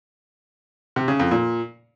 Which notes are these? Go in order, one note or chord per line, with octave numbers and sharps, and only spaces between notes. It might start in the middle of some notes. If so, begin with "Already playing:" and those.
C3
C#3
F2
A#2